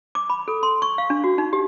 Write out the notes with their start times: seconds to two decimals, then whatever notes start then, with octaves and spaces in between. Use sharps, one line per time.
0.15 D6
0.30 B5
0.48 A4
0.63 C6
0.82 C#6
0.98 F5
1.10 D4
1.24 F#4
1.38 D#4
1.53 G4